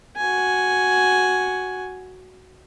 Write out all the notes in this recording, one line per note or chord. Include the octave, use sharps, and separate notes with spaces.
F#4 G#5